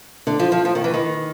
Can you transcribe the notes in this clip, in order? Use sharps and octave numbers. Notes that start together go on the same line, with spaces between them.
D3
F3
F3
F3
D#3
E3
D#3